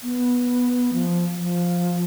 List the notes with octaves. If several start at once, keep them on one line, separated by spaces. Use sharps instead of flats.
B3
F3
F3